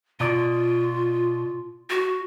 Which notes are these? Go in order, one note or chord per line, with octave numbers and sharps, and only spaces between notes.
B2 F4 D5
F#4